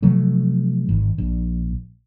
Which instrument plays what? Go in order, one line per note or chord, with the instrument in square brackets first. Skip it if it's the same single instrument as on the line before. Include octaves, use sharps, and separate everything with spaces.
[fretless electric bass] C3 F3 F#3 A3
G#1
A#1